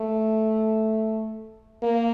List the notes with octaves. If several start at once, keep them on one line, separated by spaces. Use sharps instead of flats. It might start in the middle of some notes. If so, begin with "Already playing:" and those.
Already playing: A3
A#3